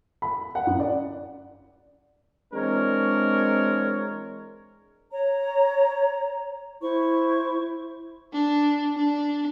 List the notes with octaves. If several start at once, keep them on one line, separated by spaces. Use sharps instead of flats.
B5
F#5
F#2
D5
E3 G#3 C4 D4 A#4 C#5
C#5 A#5
E4 C5 C#6
D4
D4